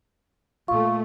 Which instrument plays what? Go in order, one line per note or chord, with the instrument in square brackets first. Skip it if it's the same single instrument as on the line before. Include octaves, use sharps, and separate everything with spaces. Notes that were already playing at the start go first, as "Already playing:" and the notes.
[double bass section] A#2 A3 [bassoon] F4 [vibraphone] C#6